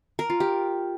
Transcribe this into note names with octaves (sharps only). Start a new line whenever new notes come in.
A#4
F4
G4